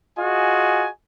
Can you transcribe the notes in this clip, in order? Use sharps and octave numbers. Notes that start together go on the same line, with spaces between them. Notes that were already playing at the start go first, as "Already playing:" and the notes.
F4 F#4 G#4 D#5 G#5